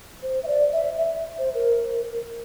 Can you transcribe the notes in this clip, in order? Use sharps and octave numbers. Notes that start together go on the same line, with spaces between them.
C5
E5
D5
E5
E5
C5
A#4